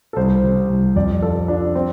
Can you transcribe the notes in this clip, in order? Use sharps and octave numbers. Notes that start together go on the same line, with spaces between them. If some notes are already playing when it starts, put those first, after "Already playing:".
A4
C2 C5
C3
C2
F2 D5
F3 A4
F3 D4
C4